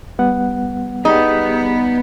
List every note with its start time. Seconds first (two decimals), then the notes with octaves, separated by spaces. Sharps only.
0.19 G3 B3 F#5
1.05 G3 B3 D#4 G4 G#4